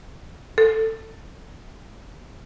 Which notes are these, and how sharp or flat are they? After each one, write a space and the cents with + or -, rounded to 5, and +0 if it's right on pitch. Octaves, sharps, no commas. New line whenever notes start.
A4 +10